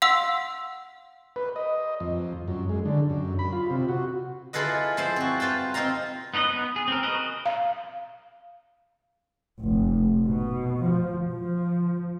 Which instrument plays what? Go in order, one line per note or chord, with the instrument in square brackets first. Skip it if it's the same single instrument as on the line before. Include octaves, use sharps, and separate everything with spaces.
[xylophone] F5 F#5 C6 E6
[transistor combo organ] B4
D#5
F2
F#2
G#3
D3
F#2
B5
F4
C3
F#4
[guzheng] E4 F4 G#4 A4 B4 D#5
F3 E4 C5 G#5 A5
C4 F#4
F4 B4 G5 A5
C4 D#4 F4 F5 A#5
[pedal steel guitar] B3 D#4 B4 D#5
B3
G#4
C4 A#4
F#4 A#4 B4 D#5
[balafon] F5
[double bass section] F1
B2
F3
F3